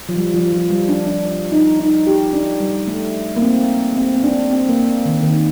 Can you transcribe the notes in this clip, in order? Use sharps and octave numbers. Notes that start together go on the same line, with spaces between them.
F3
G3
F3
F3
G3
D4
D4
D4
D#4
D#4
G4
D4
G3
A3
A#3
C4
C4
C4
D4
C4
A#3
D#3
D#3